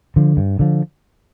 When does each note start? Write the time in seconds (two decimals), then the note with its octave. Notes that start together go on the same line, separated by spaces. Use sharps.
0.16 D3 F3
0.37 G2
0.59 D3 F3